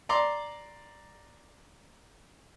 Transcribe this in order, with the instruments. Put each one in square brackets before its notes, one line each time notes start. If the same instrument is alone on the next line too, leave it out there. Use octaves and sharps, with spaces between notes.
[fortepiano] D5 A#5 C6 D6